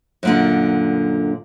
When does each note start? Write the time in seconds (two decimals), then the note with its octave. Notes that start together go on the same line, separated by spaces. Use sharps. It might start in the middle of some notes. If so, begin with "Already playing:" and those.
0.23 F#2 A#2 D3